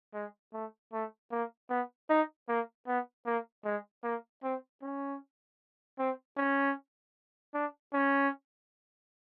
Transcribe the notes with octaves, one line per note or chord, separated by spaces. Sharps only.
G#3
A3
A3
A#3
B3
D#4
A#3
B3
A#3
G#3
A#3
C4
C#4
C4
C#4
D4
C#4